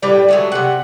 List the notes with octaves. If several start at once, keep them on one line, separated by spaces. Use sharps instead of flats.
A2 G3 B4 D5
F#3 G#3 A3
C3 F#5